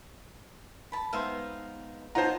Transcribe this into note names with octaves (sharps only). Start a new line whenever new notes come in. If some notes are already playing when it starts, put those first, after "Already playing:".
A5 B5
G#3 B3 D#4 C5 E5 F5
B3 D#4 F4 C5 C#5 F#5 A5 A#5